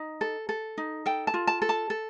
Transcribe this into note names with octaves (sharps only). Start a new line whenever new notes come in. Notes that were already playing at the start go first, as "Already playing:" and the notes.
Already playing: D#4
A4
A4
D#4
A4 G5
A5
F4
A5
A4
A5
A4